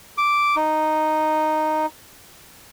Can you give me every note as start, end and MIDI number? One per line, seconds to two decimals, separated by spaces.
0.18 0.56 86
0.56 1.86 63